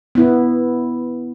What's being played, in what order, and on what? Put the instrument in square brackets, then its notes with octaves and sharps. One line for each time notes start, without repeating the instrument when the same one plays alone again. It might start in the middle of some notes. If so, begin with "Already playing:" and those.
[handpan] B3 E4